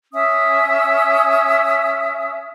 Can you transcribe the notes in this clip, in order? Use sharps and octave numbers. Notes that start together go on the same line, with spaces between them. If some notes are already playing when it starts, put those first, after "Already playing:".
C#4 E5 D#6